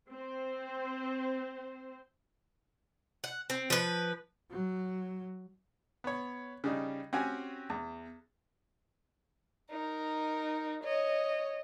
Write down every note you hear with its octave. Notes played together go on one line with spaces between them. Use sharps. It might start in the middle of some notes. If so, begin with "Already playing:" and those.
C4 C5
F#5
C4
F3 B4
F#3
B3 C#5
C#3 G3 D#4
C4 C#4 F#4 G4 G#5
E2
D#4 A#4
C#5 D#5